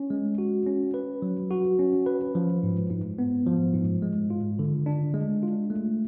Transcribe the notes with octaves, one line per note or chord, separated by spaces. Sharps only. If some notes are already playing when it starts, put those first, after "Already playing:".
Already playing: C#4
G#3
F#4
C#4
B4
F#3
F#4
C#4
B4
F3
G#2
G#2
B3
F3
G#2
G#3
F4
D3
D4
G#3
F4
A3